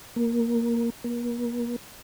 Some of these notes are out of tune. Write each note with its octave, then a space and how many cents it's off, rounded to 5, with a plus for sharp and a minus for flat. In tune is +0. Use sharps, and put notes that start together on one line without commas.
A#3 +5
A#3 +40